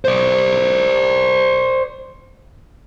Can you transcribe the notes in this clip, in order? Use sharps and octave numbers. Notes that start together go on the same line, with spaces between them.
C5 D5